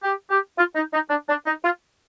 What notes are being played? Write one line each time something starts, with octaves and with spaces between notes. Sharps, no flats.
G4
G4
F4
D#4
D#4
D4
D4
D#4
F4